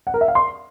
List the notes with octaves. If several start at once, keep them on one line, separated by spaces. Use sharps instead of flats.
F#5
A#4
E5
F5
C6